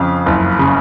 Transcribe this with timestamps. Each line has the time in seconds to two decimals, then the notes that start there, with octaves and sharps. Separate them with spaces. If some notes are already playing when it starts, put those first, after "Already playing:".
Already playing: F2 C#3 F5
0.26 F#1
0.59 C#3